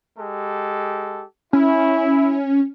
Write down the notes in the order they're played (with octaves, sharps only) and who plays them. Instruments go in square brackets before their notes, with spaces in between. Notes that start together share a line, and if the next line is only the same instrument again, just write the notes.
[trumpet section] G#3 G4 A4
[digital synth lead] C#4 [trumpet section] E4